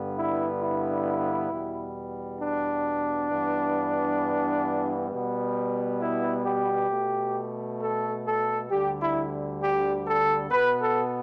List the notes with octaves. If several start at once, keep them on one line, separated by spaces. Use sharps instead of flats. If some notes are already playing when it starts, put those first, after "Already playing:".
Already playing: G2 D3 B3
E4
E4
E2 B2 G3 B3
D4
G2 E3 B3
B2 G3 B3
E4
G4
B2 A3
A4
A4
D2 D3 G3 G4
E4
G4
A4
B2 B3 B4
A4